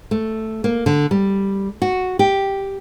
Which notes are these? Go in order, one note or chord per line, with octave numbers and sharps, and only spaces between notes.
A3
A#3
D3
G3
F#4
G4